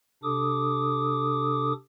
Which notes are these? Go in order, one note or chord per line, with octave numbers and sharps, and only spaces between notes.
C3 D4 A4 D6 D#6